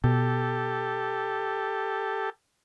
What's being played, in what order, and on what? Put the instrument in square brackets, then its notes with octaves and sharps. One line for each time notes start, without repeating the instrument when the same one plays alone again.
[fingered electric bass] B2 [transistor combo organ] G4 A4